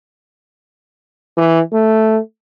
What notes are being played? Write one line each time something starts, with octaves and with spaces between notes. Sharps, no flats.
E3
A3